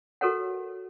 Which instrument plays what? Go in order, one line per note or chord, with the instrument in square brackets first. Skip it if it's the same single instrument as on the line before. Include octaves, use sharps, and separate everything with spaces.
[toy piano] F#4 A4 A#4 C#5 F#5